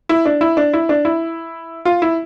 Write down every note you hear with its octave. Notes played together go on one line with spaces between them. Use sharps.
E4
D4
E4
D4
E4
D4
E4
F4
E4